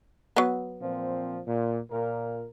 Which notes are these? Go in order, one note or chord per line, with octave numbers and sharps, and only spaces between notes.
F#3 B3
A#2 F3 C4
A#2
A#2 A#4